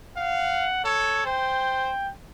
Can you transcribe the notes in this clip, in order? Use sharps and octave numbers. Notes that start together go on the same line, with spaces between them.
F5 F#5
A4 C#5
C5 G5